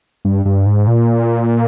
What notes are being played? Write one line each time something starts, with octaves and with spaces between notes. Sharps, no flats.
G2
G2
G#2
A#2